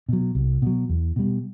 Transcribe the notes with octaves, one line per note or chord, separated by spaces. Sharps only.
B2 F#3
C2
B2 F#3
E2
B2 G3